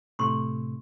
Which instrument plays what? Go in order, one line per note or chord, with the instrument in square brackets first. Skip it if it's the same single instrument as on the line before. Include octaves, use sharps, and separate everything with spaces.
[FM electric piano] A2 C3 A3 [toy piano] C6 C#6